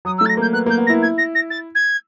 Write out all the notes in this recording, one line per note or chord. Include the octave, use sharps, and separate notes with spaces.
F#3 D#6
E6
A3 A6
A#6
A#3 G6
B3 F#6
A#3 G6
B3
A#6
E4
G#6
A#6
A#6
A6
G#6